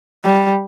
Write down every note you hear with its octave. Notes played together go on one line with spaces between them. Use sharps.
G3